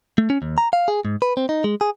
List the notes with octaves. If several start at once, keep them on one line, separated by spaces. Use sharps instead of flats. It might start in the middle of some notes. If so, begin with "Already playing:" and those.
A3
C#4
D#2
A#5
F5
G#4
G#2
B4
C4
D#4
G#3
G#4